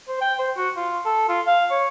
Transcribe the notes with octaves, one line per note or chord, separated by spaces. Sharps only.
C5
G5
C5
F#4
F4
A4
F4
F5
C#5